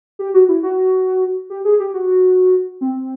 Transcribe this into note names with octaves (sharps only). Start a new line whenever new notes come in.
G4
F#4
E4
F#4
G4
G#4
G4
F#4
C4